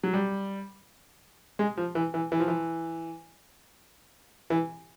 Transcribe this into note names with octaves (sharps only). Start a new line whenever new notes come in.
F#3
G3
G#3
F3
E3
E3
E3
F3
E3
E3